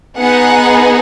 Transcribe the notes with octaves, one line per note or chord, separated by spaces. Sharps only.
B3 D#4 G#4 F#5